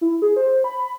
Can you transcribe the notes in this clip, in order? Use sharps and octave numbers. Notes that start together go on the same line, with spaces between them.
E4
G#4
C5
B5